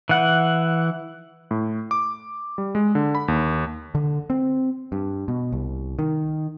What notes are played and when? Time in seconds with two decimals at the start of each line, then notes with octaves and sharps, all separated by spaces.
0.09 E3 F#5
1.51 A2
1.91 D6
2.58 G3
2.75 G#3
2.95 D3
3.15 B5
3.28 D#2
3.95 D3
4.30 C4
4.92 G2
5.28 B2
5.52 C2
5.99 D#3